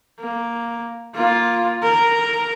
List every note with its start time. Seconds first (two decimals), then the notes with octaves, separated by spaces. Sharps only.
0.20 A#3
1.15 A#3 F4
1.83 A#4